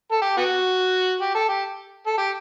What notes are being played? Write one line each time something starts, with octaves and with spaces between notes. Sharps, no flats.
A4
G4
B3 F#4
G4
A4
G4
A4
G4